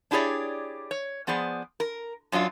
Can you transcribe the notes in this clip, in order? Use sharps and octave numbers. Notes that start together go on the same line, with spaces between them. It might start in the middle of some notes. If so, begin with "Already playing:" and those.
D4 E4 G4 G#4 C#5 D5
C#5
F3 B3 G#4 C5 D5
A#4
F#2 F#3 D4 F4